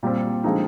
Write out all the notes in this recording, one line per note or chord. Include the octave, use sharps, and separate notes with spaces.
A#2 G3 C4
D3 F3 G#3 C4 D#4